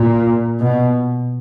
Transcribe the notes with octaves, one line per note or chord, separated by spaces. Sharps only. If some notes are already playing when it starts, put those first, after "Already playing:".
Already playing: A#2
B2